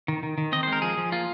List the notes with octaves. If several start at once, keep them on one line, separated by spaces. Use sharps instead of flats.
D#3
D#3
D#3
C4 D#5
C5
G#3 A#4
F3 G#4
F3
A#3 F4